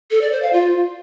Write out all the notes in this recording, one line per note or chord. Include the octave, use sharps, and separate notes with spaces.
A4
D5
C5
F5
F4